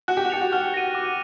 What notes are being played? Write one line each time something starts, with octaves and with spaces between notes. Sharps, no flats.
F#4 F#6
G4
F#4
G4 A6 C#7 F7
F#4
F#4 F6
A#6 D#7
D6